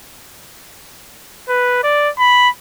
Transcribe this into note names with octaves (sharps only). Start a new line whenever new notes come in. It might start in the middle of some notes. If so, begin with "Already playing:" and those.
B4
D5
B5